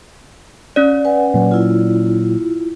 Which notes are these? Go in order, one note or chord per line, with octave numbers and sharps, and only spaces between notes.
C#4 D5
B4 F#5 G#5
A#2 F#3
E4 F4